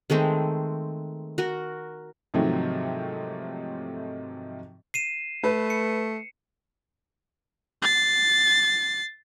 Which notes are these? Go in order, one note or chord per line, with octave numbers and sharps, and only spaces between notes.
D#3 G#3 A3 C4
F#4 A#4
G#2 C3 D#3 F3 F#3 A3
C7 D#7 E7
A3 B4
C#7
A6 C7